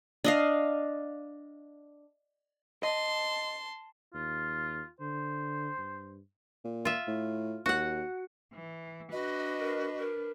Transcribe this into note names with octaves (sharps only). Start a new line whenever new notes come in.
D4 D#5 F5
D#5 A5 C6
D#2 F4
D3 C5
G2
A#2
F4 E5
A2
D#2 F#4 F#5
E3
D4 F#4 B4 D#5
A#4
A#4